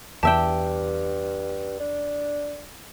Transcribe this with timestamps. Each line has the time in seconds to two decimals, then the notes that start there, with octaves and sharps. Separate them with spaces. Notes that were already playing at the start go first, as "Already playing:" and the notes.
0.23 E2 G2 G4 E5 G5 A5
1.80 D4